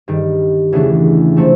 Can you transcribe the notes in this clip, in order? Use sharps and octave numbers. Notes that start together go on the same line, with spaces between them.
G2 D#3 G3
E2 C#3 E3 A3 D4
C3 F3 A3 C4